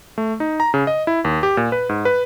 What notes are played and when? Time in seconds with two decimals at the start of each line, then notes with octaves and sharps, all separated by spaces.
0.18 A3
0.40 D#4
0.60 A#5
0.74 C#3
0.87 D#5
1.07 E4
1.25 D#2
1.43 G4
1.57 A#2
1.72 B4
1.89 G#2
2.05 B4